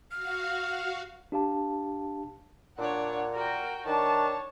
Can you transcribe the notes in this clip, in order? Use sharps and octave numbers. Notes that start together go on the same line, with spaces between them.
F#4 F5 F6
D4 G4 F5 A5
A#2 D4 C#5 F#5
F#4 A#4 G5
D#3 D4 C#5 A5